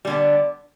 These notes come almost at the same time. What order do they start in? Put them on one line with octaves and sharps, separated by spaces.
G3 D3 B3